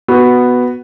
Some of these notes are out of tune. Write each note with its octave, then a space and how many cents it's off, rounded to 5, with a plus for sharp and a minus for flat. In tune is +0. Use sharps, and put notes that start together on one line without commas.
B3 +0 F#4 +0